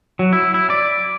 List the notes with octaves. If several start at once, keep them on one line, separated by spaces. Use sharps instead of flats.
F#3
E4
E4
D5